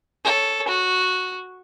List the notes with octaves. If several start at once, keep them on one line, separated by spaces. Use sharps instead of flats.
A4 C#5
F#4